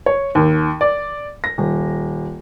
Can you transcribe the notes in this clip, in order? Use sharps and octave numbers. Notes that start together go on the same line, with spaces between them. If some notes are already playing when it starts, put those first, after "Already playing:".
C#5
D#2
D5
A#6
D#1